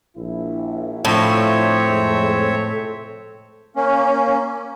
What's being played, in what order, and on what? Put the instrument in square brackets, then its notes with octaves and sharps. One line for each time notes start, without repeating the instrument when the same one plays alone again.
[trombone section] A#1 E4
[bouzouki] A2 [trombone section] F3 D4 E4 [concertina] C4 C#5 E5
[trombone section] F2 G#3
[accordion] A#3 C#4